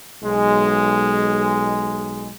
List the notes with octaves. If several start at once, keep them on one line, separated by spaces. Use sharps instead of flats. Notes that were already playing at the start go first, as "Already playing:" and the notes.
B1 G#3